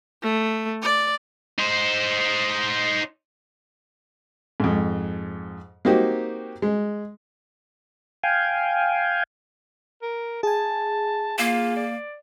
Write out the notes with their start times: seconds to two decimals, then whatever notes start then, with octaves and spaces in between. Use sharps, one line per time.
0.23 A3
0.82 D5
1.59 D#4 C5
4.60 F2 G#2
5.85 A#3 C4 D#4 F#4 G4
6.62 G#3
8.23 F5 G5 G#5
10.02 A#4
10.43 G#4 G#5 A5
11.38 A#3 F4
11.76 D5